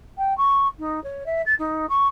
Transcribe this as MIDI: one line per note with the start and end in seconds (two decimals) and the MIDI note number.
0.18 0.36 79
0.38 0.68 85
0.79 1.02 63
1.04 1.24 73
1.26 1.42 76
1.46 1.54 93
1.59 1.86 63
1.89 2.07 85